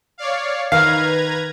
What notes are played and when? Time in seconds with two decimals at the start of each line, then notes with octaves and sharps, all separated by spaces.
0.18 C#5 D5 F5
0.72 D#3 B4 F5 A#5 G#6